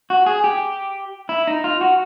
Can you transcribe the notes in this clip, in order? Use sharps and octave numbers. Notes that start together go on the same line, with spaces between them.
F#4
G#4
G4
E4
D#4
F4
F#4